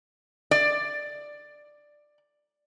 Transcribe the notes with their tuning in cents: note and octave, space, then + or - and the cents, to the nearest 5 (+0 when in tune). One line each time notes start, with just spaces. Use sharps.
D5 +10